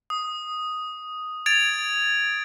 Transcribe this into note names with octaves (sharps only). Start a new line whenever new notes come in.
D#6
G#6 A6 D7 F7